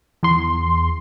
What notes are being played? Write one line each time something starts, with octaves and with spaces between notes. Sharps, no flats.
E2 C6